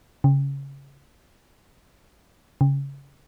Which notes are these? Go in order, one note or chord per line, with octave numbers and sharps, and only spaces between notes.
C#3
C#3